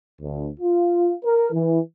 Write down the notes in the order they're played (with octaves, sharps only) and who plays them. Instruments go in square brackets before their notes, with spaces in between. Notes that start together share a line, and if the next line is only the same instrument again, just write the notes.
[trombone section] D2
F4
A#4
E3